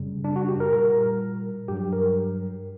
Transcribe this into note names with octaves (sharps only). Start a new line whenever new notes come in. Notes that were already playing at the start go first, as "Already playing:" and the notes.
Already playing: F#2 C#3 G3
D4
F#4
G4
A#4
A#2 G3 A#4
G2 F#3 G4
A#4